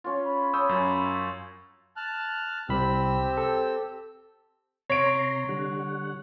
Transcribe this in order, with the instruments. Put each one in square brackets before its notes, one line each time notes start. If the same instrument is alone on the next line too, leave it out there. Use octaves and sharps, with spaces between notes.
[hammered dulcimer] C#4 F4
[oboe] B5
[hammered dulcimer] C#4 [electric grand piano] D#6 E6 G6
[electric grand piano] F#2
[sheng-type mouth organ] A5 F6 F#6
[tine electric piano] C2 B5 [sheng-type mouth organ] C4 G4 E6
[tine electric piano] A4
[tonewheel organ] C3 A#5 C6 [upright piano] C#5 D7
[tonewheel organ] D3 G3 F#5